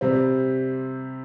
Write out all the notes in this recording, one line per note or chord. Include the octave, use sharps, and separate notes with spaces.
C3 G3 C4